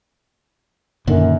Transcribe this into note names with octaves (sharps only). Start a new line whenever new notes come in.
F#2 A#2 D3 D#3